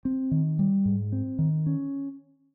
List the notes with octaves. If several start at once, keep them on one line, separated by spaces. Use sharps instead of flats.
C4
D#3
G3
G#2
C4
D#3
C#4